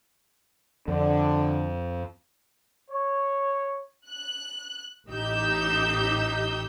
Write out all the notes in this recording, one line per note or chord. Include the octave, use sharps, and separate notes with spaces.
F2 D3
C#5
F#6
A1 D#4 G4 E6 G6